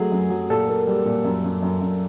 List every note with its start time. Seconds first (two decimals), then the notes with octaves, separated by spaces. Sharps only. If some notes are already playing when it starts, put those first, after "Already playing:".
Already playing: F#3 A3 G#4
0.12 F#2
0.30 F#3
0.50 A#2 A4
0.68 A#3
0.87 G3
1.05 A#2
1.24 F#2
1.44 F#2
1.63 F#2
1.81 F#2